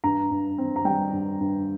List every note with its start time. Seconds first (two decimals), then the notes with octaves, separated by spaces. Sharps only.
0.04 G2 A#5
0.31 G2
0.58 C4
0.76 A#5
0.85 G3 G5
1.13 G2
1.40 G2